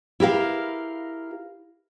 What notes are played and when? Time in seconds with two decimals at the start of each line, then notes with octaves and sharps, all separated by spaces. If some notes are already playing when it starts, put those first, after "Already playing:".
0.20 E4 G4 A#4 F5